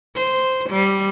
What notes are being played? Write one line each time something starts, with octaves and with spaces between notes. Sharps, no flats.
C5
G3